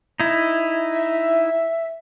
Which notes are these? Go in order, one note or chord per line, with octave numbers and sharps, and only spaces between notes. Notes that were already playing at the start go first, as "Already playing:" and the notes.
D#4 E4
E5